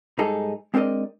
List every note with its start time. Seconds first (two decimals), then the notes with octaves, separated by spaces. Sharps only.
0.18 G#2 G3 D#4 G#4 A4
0.74 G#3 C4 D4 A#4 D5 D#5